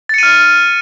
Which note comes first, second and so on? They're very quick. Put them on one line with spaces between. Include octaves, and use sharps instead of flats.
A6 C#7 D#7 F6